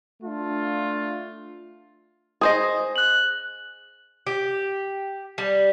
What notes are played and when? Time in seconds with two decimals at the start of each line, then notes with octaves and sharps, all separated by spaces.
0.23 A3 D4 F4
2.41 G#4 C5 D#5
2.96 F#6 F#7
4.27 G4
5.38 G3